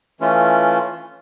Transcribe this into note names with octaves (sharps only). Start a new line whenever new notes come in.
E3 A3 C#4 F4